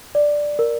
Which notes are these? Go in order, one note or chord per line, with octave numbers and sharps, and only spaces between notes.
D5
A#4